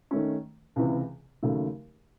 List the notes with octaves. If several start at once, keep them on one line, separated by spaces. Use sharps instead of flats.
D#3 A3 C#4
C#2 C3 E3
D#2 C#3 F#3 A3